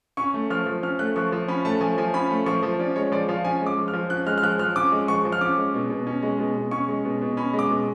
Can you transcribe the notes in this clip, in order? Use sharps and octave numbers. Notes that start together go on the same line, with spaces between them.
C#4 C#6
A3
F3 F6
F3
C#4 F6
A3 F#6
F3 C#6
F3
C#4 B5
A3 A5
F3 G#5
F3 G#5
C#4 B5
A3
F3 C#6
F3
C#4 D5
G#3 C#5
F3 D5
F3 F5
C#4 G#5
G#3
D6
F3
F6
F3
C#4 F#6
G#3 F6
F6
F3 F#6
F3 F6
C#4 D6
G#3
F3 C#6
F3
F6
C#4 D6
G#3
B2
B2
C#4
G#3
B2
B2
C#4 C#6
G#3
B2
B2
C#4 B5
G#3
D6
B2